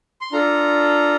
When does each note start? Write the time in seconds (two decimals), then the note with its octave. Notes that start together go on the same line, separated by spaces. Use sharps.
0.21 C6
0.32 D4 F4 A4 A#5